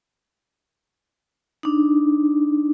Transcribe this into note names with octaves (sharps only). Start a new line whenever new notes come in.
D4 D#4